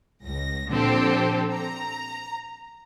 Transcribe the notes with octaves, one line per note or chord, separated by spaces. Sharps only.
C#2 A#6
A#2 D3 F3 C4 G4 A4
A#5